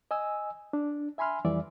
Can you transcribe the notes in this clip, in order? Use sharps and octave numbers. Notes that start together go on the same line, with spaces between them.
D#5 G#5 E6
D4
E5 G#5 B5 C6 F6
F2 E3 G3 D5 E5